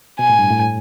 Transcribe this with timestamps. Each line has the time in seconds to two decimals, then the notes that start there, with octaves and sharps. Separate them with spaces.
0.19 B2 G#5
0.30 A2
0.39 G2
0.50 A2